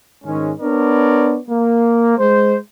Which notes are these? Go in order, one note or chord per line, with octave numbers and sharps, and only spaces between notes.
G#2 D#3 G#3 C#4
B3 D4 A#4 C#5 D5
A#3
G#3 C5